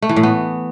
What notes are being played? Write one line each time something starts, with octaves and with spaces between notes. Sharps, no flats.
A3
E3
A2
B3